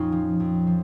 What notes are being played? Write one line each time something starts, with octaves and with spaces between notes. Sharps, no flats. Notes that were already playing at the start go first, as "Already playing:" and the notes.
Already playing: F2 A#2 C#4 D#4 F4
F3
F2
F3